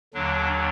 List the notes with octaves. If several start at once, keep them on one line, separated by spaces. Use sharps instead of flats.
D#2 D3 F#3 D4